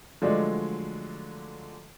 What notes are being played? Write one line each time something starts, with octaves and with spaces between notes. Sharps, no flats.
D3 F3 F#3 G#3 A3 D5